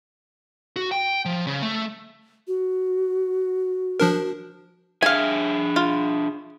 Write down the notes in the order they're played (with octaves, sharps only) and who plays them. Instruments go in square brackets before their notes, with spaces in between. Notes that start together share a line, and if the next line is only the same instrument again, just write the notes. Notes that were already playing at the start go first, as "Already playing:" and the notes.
[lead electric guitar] F#4
G5
F3
C#3
A3
[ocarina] F#4
[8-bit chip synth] F3 D4 A#4
[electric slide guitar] D4 G#4 E5 [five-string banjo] F5 G#5
[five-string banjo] F4